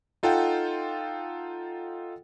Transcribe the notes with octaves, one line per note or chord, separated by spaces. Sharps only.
D#4 F4 A4 F#5 G5